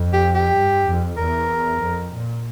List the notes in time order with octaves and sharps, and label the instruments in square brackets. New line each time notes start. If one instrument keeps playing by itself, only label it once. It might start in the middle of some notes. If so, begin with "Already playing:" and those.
Already playing: [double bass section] F2
[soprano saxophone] G4
G4
[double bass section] G2
F2
[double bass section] E2 [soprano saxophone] A#4
[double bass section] F2
A#2